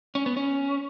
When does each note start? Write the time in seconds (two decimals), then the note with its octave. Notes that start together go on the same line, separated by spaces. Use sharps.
0.15 C#4
0.26 B3
0.37 C#4